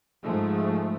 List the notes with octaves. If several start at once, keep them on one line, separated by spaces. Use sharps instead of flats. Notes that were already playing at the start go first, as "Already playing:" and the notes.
G#2 F3 G#3 A3